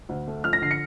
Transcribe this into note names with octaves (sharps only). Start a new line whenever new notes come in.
D2
A3
F3 F6
A#6
D3 C7
C#7